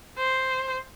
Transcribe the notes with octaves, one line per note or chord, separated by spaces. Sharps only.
C5